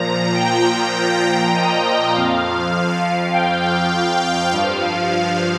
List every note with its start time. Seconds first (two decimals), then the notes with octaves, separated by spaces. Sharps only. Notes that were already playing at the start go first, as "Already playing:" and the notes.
Already playing: A#2 F3 A#5
0.34 G5
1.54 D#5
1.84 D#5
2.13 F2 F3 F5
3.33 G5
3.62 G5
4.52 G2 F3 F5